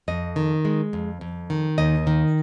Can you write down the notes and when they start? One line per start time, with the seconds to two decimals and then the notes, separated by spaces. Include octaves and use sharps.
0.08 F2 D#5
0.36 D#3
0.65 G#3
0.93 F2
1.21 F2
1.50 D#3
1.78 D#2 D#5
2.07 D#3